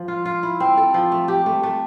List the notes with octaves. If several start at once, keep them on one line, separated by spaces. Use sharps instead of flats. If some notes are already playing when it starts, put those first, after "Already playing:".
Already playing: F3
F4
F4
E4
C4
A4
F3
A3
G4
A3
A3